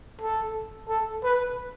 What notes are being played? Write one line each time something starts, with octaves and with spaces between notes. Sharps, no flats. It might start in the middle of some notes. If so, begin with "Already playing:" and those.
A4
A4
B4